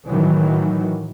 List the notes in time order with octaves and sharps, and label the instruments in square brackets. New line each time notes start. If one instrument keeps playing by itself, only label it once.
[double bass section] A2 D#3 E3 F#3